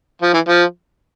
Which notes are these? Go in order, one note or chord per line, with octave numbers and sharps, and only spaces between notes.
F3
E3
F3